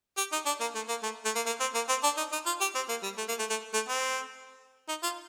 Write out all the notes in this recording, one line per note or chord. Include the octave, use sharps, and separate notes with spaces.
G4
D#4
D4
A#3
A3
A#3
A3
A3
A#3
A#3
C4
A#3
C4
D4
D#4
D#4
F4
G4
C4
A#3
G3
A3
A#3
A3
A3
A3
C4
D#4
F4